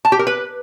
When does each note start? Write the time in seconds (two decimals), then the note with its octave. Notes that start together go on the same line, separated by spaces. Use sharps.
0.05 A5
0.12 G4
0.19 A#4
0.27 B4